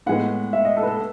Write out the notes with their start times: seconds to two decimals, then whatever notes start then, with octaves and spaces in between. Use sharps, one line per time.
0.06 A2 G#3 B3 F#5
0.53 E5
0.65 D#5
0.77 A4
0.83 B4
0.87 A4